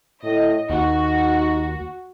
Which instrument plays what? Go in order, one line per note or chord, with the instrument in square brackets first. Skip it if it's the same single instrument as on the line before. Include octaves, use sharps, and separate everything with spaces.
[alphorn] A2 [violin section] D#5
[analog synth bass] D#2 [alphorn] D#4 [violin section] F#4